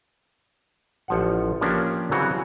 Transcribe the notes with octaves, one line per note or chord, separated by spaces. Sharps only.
A1 F3 F#5
F3 A#3 C#4 D4 G4 A#4
C#3 E3 F#3 C4 F#4